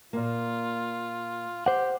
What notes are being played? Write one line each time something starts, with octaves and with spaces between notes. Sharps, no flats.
A#2 A#3 F4
G4 C5 F#5